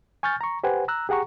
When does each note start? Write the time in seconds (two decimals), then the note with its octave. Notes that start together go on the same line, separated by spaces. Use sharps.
0.23 G#5 C#6 F6 G6 A6
0.41 A#5 C#6
0.64 G4 B4 C5 F#5 G#5
0.88 A#5 E6 F#6
1.09 G4 G#4 F#5 A#5 C#6